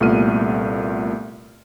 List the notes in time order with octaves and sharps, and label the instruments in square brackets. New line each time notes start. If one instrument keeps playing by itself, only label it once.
[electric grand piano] C2 A#2 A3 B3 F6 D#7